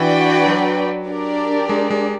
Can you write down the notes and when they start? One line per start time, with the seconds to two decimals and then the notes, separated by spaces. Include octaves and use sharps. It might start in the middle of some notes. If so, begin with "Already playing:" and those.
Already playing: E3 D4 F#4 B4 D5 G5
0.46 F#3
1.08 D4 G4 A#4 D5
1.69 G#3
1.90 G#3